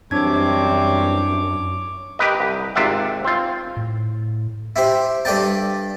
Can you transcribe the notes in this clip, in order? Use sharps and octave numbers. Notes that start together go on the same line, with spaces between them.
F#2 E3 G3 C4 D4 C#5 D6 G#6
G4 A#4 B4 D#5
C2
G#1 C3 F4 D5 E5 F#5
C4 F4
A2
E4 G4 C5
G2 A4 D5 G5 A5